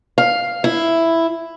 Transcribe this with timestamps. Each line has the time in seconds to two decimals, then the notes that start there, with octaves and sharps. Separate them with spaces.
0.18 F5
0.64 E4